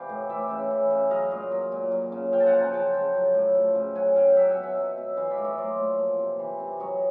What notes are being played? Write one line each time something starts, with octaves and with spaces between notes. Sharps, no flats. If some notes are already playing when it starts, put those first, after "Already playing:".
Already playing: C3 E3 D5 F5 G5
A2
E3 D5 E5
C#3
E3
C#3
F#3 D#5 F5
A#2
F#3
A#2
F#3
C#3
F3 F5 G5
A5
F#5 G#5
C#3
G#5 A#5
F3 G5 A5
C#3
F#3
A2
F3
C#3
F#3 F#5 G#5
C#3 F5 G5
F#3 E5 F#5
F#5 G#5
B2
E5 F#5
F#3
B2
E3 D#5 F5
D5 E5
A2
C#5 D#5
F#3 C5 D5
A#2
F3
C3
E3
C3
F#3 C#5 D#5